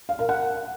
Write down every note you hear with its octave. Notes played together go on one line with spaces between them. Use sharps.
F5
A#4
F#5